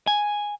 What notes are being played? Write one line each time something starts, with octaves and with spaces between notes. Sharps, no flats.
G#5